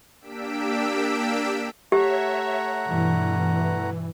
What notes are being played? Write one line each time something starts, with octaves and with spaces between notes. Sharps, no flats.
A#3 D4 G4 E6 B6 D7
A3 G4 C#5 E5 F#5 A#5
G2 B2 E3